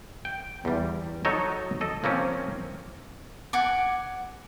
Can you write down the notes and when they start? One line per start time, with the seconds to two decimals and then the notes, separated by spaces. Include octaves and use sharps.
0.25 G5
0.65 E2 G3
1.25 F#3 D#4 A4 C#5 D#5
1.81 A4 D#5
2.04 F3 A#3 C4 C#4
3.53 F#5 G#5 D6